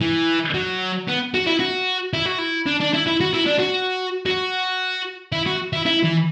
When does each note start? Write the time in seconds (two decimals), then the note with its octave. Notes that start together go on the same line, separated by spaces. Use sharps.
0.01 E3
0.54 F#3
1.08 B3
1.34 F#4
1.47 E4
1.60 F#4
2.13 E4
2.26 F#4
2.38 E4
2.66 D4
2.80 D4
2.93 E4
3.07 E4
3.21 F#4
3.34 E4
3.46 D4
3.59 F#4
4.26 F#4
5.32 E4
5.46 F#4
5.73 E4
5.85 E4
6.03 E3